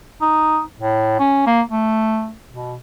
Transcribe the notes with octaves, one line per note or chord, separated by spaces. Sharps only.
D#4
A2
C#4
A#3
A3
B2